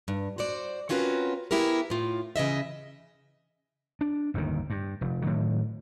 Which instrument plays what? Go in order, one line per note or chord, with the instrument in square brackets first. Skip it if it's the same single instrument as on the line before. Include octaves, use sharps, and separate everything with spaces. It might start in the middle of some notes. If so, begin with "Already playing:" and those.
[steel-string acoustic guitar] G2
F#4 C5 D5
C4 C#4 F4 F#4 A#4 B4
B3 E4 G4 G#4 A#4
A2 F4
C#3 E3 D#5 E5
[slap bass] D4
G1 D#2 C3 D#3
G2
F1
A2 D#3 F#3